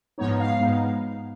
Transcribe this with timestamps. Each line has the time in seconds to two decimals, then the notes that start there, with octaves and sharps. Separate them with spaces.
0.18 G#2 F3 G#3 B3 D#4 C#5
0.39 F5
0.60 G#2 F3 G#3 B3 D#4